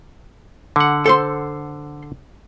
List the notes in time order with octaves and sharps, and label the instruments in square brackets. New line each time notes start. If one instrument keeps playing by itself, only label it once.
[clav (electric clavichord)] D3 F#5
[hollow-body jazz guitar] A4 C5 C6